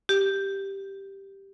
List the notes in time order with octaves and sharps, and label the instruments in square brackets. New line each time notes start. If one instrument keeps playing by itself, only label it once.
[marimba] G4